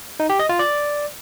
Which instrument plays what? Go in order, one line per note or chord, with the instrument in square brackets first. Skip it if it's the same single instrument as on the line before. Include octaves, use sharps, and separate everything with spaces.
[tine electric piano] D#4
G4
D#5
F4
D5